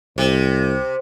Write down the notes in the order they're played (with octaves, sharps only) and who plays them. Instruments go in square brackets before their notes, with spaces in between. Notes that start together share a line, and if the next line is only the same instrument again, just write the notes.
[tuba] C2 [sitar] C3